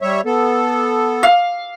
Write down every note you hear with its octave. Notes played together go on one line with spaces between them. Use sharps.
G3 C#5 E5
B3 A4
F5